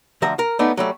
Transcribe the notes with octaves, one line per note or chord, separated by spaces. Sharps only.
D2 F3 E5 A#5
A#4
A3 B3 D4 D#4
F#3 G3 A3